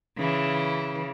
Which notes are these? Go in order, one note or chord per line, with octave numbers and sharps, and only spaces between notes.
C#3 E3